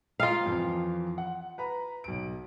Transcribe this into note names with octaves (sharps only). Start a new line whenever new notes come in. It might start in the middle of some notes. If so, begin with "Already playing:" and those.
F4 F5 G5 A#5 D#6
F2 E3 F3
F#5
B4 A#5 B5
B1 D7